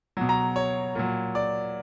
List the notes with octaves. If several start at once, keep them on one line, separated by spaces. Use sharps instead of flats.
B2 F#3
A#5
C#5
A#2 F#3
D5